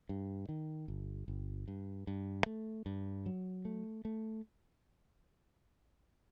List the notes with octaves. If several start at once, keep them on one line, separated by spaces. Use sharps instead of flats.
G2
D#3
G1
G1
G2
G2
A3
G2
F#3
A3
A3